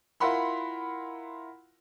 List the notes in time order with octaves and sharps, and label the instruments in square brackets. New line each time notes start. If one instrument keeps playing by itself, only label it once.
[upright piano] E4 F4 A#4 F#5 B5 C6